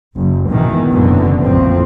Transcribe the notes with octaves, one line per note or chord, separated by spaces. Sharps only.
F#1
E2 G#2 B2 D#3 E3
F#1 F#2 B2 D3 E3
A#1 F2 A2 F3 C4